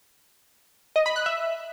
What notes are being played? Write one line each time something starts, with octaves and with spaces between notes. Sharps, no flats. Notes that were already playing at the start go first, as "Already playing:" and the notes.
D#5
B5
F#6
E5